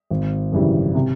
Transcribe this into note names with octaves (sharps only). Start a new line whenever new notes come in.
G#1
F#2 C#3 E3 G3
C3